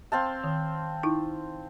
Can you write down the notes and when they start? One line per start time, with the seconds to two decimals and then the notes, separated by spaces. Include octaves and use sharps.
0.12 C4 F5 A5
0.44 D#3
1.03 D#4 E4